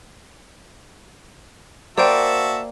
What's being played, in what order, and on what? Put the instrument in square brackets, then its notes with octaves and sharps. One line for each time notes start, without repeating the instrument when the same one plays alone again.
[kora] A#3 C5 [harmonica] F#4 E5 A5 [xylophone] D5 G5